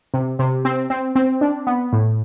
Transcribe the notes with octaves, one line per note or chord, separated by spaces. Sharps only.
C3
C3
C4
C4
C4
D4
B3
A2